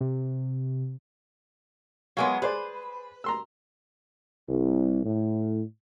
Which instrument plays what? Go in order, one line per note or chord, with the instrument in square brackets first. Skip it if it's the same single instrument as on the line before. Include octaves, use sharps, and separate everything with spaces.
[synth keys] C3
[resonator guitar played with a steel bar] F#3 G#3 B3 [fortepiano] F5 G#5 C6
[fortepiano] G#4 C5 D5 [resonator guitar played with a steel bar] B4
[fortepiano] A#5 C6 E6
[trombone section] C2
A2